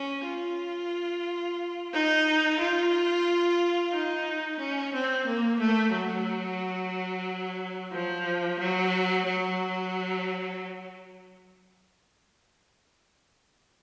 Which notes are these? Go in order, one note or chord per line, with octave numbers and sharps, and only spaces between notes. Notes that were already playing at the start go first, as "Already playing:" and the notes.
Already playing: C#4
F4
D#4
F4
D#4
C#4
C4
A#3
A3
F#3
F3
F#3
F#3